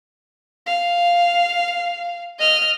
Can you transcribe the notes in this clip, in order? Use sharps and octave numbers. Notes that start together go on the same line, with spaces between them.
F5
D#5 F6